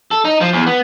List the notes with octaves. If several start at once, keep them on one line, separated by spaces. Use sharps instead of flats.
A4
D#4
F3
E2
B3